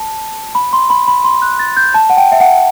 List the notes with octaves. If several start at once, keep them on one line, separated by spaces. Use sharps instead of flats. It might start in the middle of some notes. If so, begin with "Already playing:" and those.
Already playing: A5
B5
C6
B5
B5
C6
F#6
A6
G6
A5
F#5
G5
E5
F#5